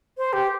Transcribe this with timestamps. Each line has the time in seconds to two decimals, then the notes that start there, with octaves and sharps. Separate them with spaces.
0.18 C5
0.33 G4